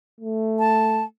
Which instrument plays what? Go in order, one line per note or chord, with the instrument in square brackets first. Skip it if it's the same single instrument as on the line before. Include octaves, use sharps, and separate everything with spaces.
[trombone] A3
[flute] A5